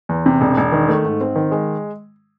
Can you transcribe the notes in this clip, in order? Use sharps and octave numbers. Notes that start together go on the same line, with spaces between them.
E2
C3
E1
E1
D#3
A3
G#2
C4
D#3
G#3